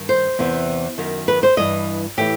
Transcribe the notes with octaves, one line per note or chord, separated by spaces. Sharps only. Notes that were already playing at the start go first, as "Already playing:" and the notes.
Already playing: G2 D#3
C5
E2 C3 E3
F#2 D#3
B4
C5
G2 E3 D#5
A2 E3 G4